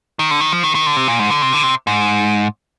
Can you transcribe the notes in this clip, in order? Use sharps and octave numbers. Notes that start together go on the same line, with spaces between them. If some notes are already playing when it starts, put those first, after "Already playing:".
D#3
D3
D#3
F3
D#3
D#3
D3
C3
A#2
G#2
D3
C3
D3
C3
G#2